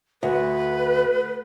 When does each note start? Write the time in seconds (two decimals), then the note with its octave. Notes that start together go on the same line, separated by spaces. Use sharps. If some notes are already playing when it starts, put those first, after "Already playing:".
0.23 D2 B4